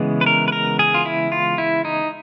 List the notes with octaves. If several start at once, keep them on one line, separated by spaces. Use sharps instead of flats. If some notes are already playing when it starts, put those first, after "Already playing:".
Already playing: C#3 E3 G#3 B3
B4
A#4
B4
A#4
G#4
F4
E4
F4
E4
D#4